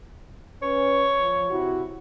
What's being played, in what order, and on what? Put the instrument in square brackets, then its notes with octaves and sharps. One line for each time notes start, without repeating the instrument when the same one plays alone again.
[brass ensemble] C#4 B4 [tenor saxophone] C#5
[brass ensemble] F3
C3 E4 F#4